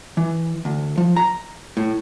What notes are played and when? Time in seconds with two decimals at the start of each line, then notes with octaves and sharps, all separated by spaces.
0.17 E3
0.65 D2
0.98 F3
1.16 A#5
1.77 A2